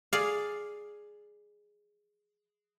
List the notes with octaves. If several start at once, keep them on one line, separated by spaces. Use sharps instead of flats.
G#4 D5 F5